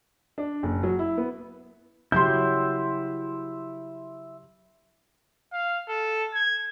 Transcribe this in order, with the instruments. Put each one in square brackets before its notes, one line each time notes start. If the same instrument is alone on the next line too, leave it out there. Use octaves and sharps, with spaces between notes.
[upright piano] D4
F#1
F#3
E4
B3
[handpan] C#3 F#3 G4 [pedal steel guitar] E4 E5 [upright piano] C6 G6
[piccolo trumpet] F5
A4
G#6